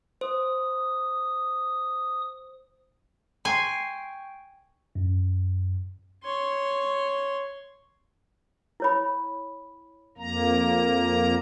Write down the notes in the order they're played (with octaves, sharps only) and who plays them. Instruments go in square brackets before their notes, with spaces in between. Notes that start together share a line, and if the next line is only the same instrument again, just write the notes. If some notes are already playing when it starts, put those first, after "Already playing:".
[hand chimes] C5 [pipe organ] D#6
[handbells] G5 C#6 [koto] G#5 [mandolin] C6
[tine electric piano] F#2
[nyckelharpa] C#5 C6
[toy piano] E4 C#5 B5
[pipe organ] F2 A#3 A#5